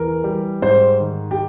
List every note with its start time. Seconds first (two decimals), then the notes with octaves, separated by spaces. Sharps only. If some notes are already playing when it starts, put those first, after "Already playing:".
Already playing: E2 E3 A#4
0.24 G3
0.62 G#2 C5
1.00 D#3
1.31 G4